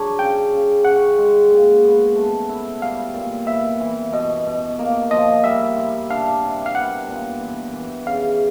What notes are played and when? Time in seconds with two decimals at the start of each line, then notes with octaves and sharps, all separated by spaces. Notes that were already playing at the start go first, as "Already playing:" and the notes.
Already playing: F#3 D4 G#4
0.19 C#3 G5
0.52 C#3
0.85 C#4 F#5
1.18 G#3
1.50 A#2
1.84 B3
2.16 A3
2.49 E4
2.82 G3 F5
3.14 A#2
3.47 B3 E5
3.80 E3
4.13 B2 D#5
4.47 B2
4.79 A#3
5.11 F3 D#5
5.44 G3 E5
5.77 E4
6.10 D4 F5
6.43 C3
6.66 F5
6.75 B3 F#5
7.09 A#2
7.40 E3
7.74 E3
8.07 C#3 F5